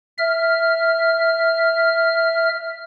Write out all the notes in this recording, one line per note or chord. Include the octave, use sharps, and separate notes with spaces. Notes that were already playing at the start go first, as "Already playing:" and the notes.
E5 F6